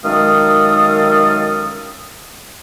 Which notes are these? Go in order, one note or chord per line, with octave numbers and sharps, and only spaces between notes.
F#2 D#3 G#3 A4 F5 D#6